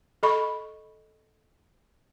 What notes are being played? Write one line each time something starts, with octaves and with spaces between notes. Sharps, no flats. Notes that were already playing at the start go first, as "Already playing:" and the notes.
A4 D#5 B5 C#6